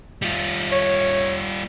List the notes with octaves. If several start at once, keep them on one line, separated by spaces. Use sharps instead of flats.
G3 F4
C#5